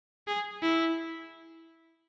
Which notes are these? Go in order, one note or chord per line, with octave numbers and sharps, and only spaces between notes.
G#4
E4